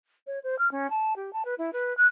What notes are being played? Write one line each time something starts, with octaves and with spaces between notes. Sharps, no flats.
C#5
C5
F6
C#4
A5
G4
A5
B4
E4
B4
F#6